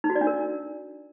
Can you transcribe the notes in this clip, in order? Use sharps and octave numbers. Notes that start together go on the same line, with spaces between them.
D#4
F#4
D5
D4
A#4